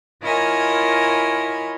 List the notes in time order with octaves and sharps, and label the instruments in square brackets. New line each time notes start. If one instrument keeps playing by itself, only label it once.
[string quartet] E4 F4 A#4 C#5 D#5 G#5